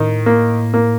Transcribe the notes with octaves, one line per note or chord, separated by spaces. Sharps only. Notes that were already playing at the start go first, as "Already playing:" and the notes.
Already playing: A2 D#3
A#3
A#3